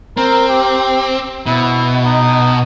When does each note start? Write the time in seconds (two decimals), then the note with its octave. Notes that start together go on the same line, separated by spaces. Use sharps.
0.17 C4 A#4
0.49 G4
1.46 B2 E4
2.05 D#4